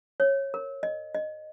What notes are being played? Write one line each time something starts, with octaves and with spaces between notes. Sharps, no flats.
C#5
A#4
D#5
D#5